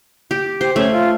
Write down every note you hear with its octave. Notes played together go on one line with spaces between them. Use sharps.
G4
G4 C5
A3 C#4
F4